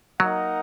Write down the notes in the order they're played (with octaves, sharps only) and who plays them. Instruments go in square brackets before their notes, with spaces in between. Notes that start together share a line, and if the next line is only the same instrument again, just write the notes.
[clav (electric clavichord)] F#3 [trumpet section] A#3 D#4 A#4 D#5 F#5